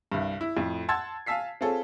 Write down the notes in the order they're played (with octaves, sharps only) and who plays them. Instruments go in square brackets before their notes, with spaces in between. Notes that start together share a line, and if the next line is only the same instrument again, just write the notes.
[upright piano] C2 G2
E4
F2 A2
F#5 A5 C6 E6 G#6 A6
F5 G#5 A5 E6 B6 C7
C4 F4 G#4 A4 C#5